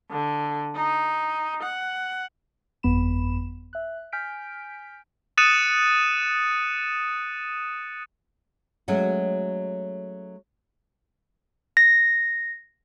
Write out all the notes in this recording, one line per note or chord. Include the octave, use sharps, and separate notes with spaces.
D3
D#4
F#5
G1 F2 B3 B5 E7
E5 F#6
G#5 F6 G6 B6 D7
D#6 F#6 A6 C#7 D#7 E7
F#3 G#3 A3 C#4 F#4
A#6